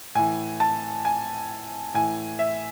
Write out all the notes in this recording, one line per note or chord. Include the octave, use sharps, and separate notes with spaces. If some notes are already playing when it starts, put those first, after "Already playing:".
A2 E3 G#5
A5
G#5
A2 E3 G#5
E5